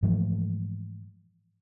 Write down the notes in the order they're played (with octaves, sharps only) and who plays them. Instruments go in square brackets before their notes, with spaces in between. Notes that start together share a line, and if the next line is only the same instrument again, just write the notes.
[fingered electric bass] G#2 E3 F3 A3